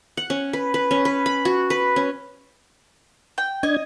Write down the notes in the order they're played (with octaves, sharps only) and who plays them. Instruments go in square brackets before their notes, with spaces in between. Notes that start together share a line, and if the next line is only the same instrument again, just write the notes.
[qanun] F#5
C#4
B4
B4
C#4
B4
B5
F#4
B4
C#4
[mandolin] G5
[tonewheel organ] D4 G#6 [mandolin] D#5